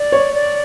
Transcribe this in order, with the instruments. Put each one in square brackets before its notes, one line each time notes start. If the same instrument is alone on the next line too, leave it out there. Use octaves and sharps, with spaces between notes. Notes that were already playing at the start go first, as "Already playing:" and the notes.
Already playing: [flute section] D5
[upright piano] C#5
[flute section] D5